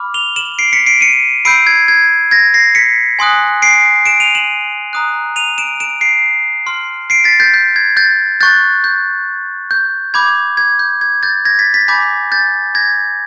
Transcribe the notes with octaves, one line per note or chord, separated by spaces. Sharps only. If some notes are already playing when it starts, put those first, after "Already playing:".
Already playing: B5 D6 F6
F7 G7
E7 F#7
C7 D7
B6 C#7
C7 D7
C#7 D#7
B5 E6 G6 C7 D7
G#6
G#6
G#6 A#6
A#6 C7
B6 C#7
G#5 C6 D#6 F#6
C7 D7
D7 E7
D#7 F7
E7 F#7
A#5 D#6 F#6
D#7 F7
D7 E7
D7 E7
C7 D7
C6 F6
C7 D7
A6 B6
G6 A6
G6
G#6
G6 A6
C#6 F#6 G6 A6
G6
G6
B5 D6 G6 G#6
G#6
G6
G#6
G6 A6
G#6 A#6
A6 B6
A6 B6
G#5 B5 D6 G6 A6 B6
G6 A6
G#6 A#6